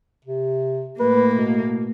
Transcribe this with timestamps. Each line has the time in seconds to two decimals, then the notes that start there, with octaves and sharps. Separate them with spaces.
0.25 C3
1.00 A2 A#3 B4
1.34 B2